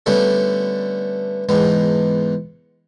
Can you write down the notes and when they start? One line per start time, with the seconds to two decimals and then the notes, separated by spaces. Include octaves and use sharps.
0.06 D3 G3 A3 B3 C#4
1.49 E2 G#2 B3